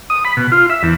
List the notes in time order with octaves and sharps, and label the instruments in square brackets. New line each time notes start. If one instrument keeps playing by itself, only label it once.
[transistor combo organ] D#6
B5
B2
F4
E5
E2